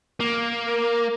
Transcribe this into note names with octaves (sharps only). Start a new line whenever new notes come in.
A#3